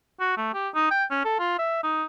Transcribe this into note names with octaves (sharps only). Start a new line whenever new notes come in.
F#4
A3
G4
D#4
G5
C#4
A4
F4
E5
D#4